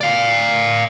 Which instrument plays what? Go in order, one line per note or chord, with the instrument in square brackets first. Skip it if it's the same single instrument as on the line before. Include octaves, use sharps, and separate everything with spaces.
[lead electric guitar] D5 F5